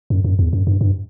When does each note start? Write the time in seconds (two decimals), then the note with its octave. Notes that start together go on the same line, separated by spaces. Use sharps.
0.10 F#2
0.24 F#2
0.39 E2
0.53 F#2
0.67 G2
0.81 G2